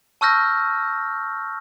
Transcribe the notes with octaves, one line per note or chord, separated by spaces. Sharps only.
A5 C#6 E6 F6 G6 A#6